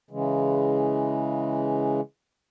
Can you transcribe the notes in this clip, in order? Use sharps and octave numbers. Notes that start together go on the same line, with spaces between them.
C#3 E3 G#3